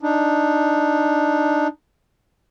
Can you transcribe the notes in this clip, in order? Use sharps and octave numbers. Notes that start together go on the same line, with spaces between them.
D4 D#4